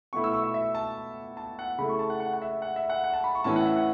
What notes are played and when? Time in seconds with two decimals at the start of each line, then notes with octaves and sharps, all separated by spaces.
0.13 B2 A3 E4 C#6
0.24 E6
0.33 C#6
0.44 E5
0.54 E5
0.75 A5
1.37 A5
1.59 F#5
1.78 C#3 A3 E4 B5
1.89 C#6
1.99 A5
2.10 F#5
2.20 F#5
2.34 F#5
2.42 E5
2.62 F#5
2.76 E5
2.90 F#5
3.04 F#5
3.14 A5
3.24 B5
3.35 C#6
3.44 A2 E3 C#4 E4 A5
3.56 F#5
3.66 E5
3.76 F#5